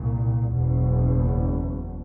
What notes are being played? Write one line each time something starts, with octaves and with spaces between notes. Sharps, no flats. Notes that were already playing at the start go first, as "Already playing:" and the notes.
Already playing: C2 A#2
F#1 E2 B2